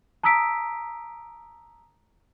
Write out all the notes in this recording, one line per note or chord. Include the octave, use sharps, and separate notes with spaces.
A5 A#5 D#6 E6 B6 D7